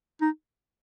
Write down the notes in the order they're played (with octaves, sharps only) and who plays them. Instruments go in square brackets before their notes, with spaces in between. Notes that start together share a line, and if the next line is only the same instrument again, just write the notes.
[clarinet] D#4